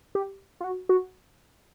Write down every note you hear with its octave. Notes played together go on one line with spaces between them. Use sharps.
G4
F4
F#4
F#4